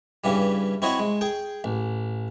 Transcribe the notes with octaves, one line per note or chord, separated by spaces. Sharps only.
G2 C#3 E3 G3
C4 E4 F#4 C#5 D#5
G#3
G#4 G5
A1